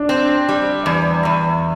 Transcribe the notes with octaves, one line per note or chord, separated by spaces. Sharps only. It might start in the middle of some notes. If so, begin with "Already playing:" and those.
Already playing: D4
C4
G3
E2
E2